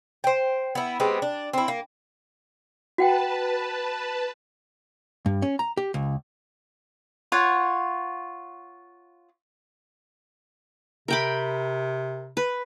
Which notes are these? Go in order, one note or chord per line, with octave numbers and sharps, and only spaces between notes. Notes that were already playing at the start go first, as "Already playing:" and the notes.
C5 G5
B3 E4
G#3 B3 C4 G4
D4
C4 E4
A#3
F#4 B4 F#5 G5 A5
G2
C#4
A#5
G4
C#2
F4 C#5 F#5
C3 A#4 G5 B5
B4